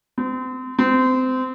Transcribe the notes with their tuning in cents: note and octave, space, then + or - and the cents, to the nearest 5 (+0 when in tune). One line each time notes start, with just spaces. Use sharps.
C4 -35
C4 -25